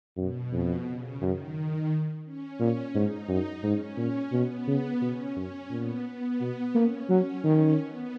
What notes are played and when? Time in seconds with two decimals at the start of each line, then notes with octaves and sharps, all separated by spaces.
0.17 F#2 B2
0.52 F2
0.86 C#3
1.21 F#2 D#3
2.25 C#4
2.60 A#2
2.94 G#2 D#4
3.28 F#2
3.63 G#2 C#4
3.97 A#2
4.33 B2 B3
4.68 C#3
5.01 B2 C#4
5.36 F#2 C#4
5.70 A#2 B3
6.05 B3
6.40 B2
6.74 A#3 C#4
7.09 F#3 C#4
7.44 D#3 C#4
7.78 B3